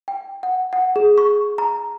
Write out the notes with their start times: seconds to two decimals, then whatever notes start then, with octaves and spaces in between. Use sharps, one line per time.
0.08 G5
0.43 F#5
0.73 F#5
0.96 G#4
1.18 C#6
1.58 A#5